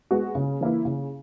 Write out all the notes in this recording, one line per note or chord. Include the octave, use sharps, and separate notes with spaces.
G#3 B3 F#4
C#3
E3 A#3 E4
C#3